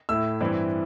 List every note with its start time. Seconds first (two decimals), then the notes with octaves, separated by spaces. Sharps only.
0.09 A2 A3 E4 E6
0.40 G2 E3 C4 E4